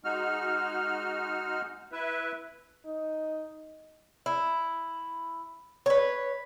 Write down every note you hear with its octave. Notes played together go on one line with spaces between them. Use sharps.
G#3 D#4 F#4 F6
E4 B4 E5
D#4
E4
B4 C#5